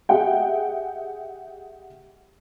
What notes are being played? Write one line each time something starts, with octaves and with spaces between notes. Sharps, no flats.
G4 G#4 D#5 E5 F#5 G5